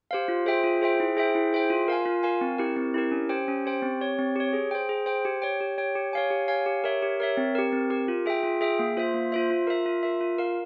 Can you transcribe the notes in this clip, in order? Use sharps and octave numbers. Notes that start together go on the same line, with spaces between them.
G4 C5 F5
F4
G#4 C5 E5 G5
F4
G#4 C5 E5 G5
E4
G#4 C5 E5 G5
E4
G#4 C5 E5 G5
F4
A#4 F5 G#5
F4
A#4 F5 G#5
C4
E4 G4 A#4
C4
E4 G4 A#4
C#4
G4 C5 G5
C#4
G4 C5 G5
C4
G4 C#5
C4
G4 C#5
G#4
C5 G5
G#4
C5 G5
G4
C#5 G5
G4
C#5 G5
G4
C#5 F5 G#5
G4
C#5 F5 G#5
G4
A#4 C#5 E5
G4
A#4 C#5 E5
C4
G4 A#4
C4
G4 A#4
F4
G#4 E5 G5
F4
G#4 E5 G5
A#3
F4 C5 E5
A#3
F4 C5 E5
F4
A#4 E5
F4
A#4 E5
F4
A#4 F5